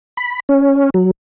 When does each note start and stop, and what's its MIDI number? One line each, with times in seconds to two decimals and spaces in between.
0.17 0.40 83
0.49 0.90 61
0.94 1.11 54